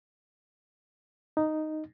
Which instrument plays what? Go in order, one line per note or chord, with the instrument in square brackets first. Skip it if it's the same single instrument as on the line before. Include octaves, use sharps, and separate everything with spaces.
[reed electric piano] D#4